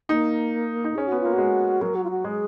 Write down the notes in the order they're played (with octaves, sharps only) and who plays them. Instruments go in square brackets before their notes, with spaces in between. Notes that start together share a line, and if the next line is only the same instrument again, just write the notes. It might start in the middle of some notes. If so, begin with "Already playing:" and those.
[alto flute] A#3 [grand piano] D#4
[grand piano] D#4
[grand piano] C#4 [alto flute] G#4
[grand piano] B3 [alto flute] F#4
[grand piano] A#3 [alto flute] F4
[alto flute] F#4
[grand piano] G#3
[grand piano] F#3 [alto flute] A#4
[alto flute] F#4
F4
F#4
[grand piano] G#3 [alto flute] G#4